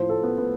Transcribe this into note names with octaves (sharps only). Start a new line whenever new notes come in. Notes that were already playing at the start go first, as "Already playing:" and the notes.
Already playing: A2 F3 C5
A4
B3
B3